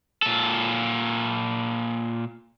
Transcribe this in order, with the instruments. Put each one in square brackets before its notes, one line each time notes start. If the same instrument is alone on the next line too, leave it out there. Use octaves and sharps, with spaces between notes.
[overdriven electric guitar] A#2 A4